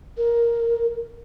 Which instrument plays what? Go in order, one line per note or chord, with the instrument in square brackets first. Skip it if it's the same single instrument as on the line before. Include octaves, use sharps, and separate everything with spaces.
[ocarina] A#4